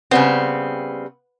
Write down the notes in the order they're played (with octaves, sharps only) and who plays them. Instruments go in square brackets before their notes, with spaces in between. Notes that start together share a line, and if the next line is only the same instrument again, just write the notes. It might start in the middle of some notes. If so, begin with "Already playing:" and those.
[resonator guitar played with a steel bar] C#3 G3 C4 [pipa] B3